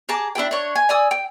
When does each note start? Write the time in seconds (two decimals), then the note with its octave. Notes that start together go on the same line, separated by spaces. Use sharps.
0.09 G#4 A5 A#5 D6
0.35 D4 E4 G#4 G5
0.51 D4 C#5
0.76 G#5
0.89 D5 G#5 D#6 E6
1.11 G5